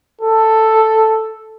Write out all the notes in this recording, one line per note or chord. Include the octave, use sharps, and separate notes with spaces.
A4